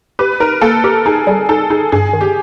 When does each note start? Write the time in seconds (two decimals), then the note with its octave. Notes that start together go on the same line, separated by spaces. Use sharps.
0.19 G4 B4
0.40 D#4 A#4
0.61 A#3 A4
0.84 G4 A#4
1.06 D#4 G#4
1.27 G3 G#4
1.49 D#4 A4
1.70 D#4 G#4
1.92 G2 G#4
2.13 D#3
2.21 G4